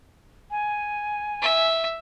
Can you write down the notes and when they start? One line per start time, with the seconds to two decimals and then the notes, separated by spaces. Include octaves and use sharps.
0.51 G#5
1.42 E5